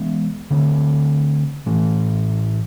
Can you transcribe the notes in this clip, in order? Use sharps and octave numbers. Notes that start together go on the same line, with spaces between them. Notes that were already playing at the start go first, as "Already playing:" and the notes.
Already playing: E3 G#3 B3
D3 A3 C4
A2 E3 A3